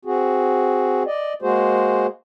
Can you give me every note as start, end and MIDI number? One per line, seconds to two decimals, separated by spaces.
0.05 1.03 60
0.05 1.03 66
0.05 1.03 68
1.06 1.33 74
1.06 1.33 75
1.42 2.06 56
1.42 2.06 58
1.42 2.06 66
1.42 2.06 68
1.42 2.06 72